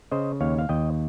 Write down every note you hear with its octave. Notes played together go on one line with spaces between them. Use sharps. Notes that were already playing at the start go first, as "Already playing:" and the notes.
C#3 C5 D#5
D#2 C#5 F5
F5
D#2 D#5 G5